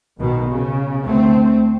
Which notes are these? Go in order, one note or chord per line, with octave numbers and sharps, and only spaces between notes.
B1 B2 D#3
C#3
D2 A3 C4